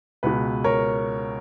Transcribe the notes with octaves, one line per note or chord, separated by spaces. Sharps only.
C#2 B2 B4
A#4 C#5